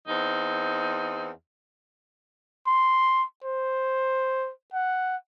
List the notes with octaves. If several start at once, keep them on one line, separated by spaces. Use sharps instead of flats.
E2 C4 D#4
C6
C5
F#5